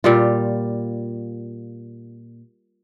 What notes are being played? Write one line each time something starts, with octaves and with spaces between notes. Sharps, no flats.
A#2 G3 F4